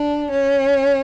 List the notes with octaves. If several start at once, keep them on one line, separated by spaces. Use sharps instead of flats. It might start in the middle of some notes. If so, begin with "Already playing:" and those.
Already playing: D4
C#4